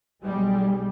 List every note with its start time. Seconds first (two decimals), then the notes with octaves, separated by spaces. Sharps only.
0.22 B1 G3 G#3